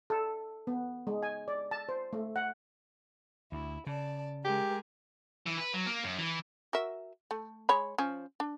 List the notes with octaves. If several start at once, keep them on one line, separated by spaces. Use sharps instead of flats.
A4
B3
G#3
G#5
D5
A5
C5
A3
F#5
D2 E4
C#3 D5 A5
G#3 G4 G#4 A#4
E3
B4
F#3
A#3
F#2
E3
F#4 A#4 E5
A3
G#3 C#5 B5
F3 C#4
D4